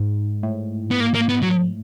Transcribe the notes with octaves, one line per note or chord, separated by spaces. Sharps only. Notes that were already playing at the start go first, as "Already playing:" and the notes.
Already playing: G#2
A2
B3
A#3
A#3
B3
F#3